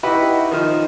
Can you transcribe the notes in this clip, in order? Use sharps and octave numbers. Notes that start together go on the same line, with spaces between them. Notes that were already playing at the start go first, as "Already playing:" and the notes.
D#4 E4 F#4 G4 B4
D#3 F3 D#4 C5 F6